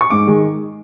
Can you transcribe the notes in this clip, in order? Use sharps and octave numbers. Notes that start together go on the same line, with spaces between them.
C#6
G#2 D6
D#3 G#3